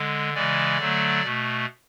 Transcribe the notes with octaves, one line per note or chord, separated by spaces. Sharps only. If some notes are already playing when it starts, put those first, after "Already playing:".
Already playing: D3 G#3
C#3 E3 G#3 D5
D3 F#3 A3
B2 A3